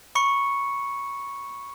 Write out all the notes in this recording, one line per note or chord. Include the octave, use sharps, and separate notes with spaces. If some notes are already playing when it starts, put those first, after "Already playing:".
B5 C#6 C#7